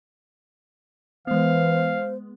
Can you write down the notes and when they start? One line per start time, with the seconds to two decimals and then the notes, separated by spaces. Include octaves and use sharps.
1.27 E3 G#3 B3 C5 F5